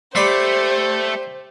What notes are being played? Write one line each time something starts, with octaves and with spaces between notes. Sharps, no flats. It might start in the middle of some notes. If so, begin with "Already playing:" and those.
A3 G4 C5 D5 B5 C6